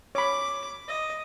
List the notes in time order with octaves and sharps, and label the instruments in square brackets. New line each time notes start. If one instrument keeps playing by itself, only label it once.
[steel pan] C#5 B5 [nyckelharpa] D6
[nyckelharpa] D#5